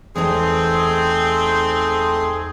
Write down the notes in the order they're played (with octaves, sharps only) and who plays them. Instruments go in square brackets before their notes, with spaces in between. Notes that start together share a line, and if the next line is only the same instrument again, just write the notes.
[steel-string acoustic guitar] E2 D#4 [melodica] A3 C6 D#6 [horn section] C4 [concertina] G#4